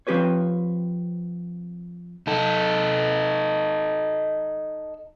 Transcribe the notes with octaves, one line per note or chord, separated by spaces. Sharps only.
F3 C4 G4 B4 C#5
D#4 A4